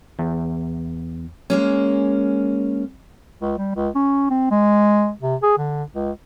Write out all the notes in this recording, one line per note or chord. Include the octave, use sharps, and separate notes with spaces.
E2
G#3 A#3 C#4
C#2
G3
C#2
C#4
C4
G#3
C3
G#4
D3
C#2